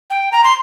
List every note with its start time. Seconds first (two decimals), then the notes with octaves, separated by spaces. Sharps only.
0.10 G5
0.32 A#5
0.44 C6